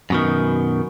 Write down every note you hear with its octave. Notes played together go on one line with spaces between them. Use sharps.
F#2 B2 D#3